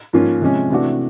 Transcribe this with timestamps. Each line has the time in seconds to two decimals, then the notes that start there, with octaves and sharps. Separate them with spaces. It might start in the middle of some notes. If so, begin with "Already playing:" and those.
0.13 G#2 F3 A#3 C#4 F4
0.42 C3 F3 G#3 C#4
0.70 C3 E3 A3 D4 F#4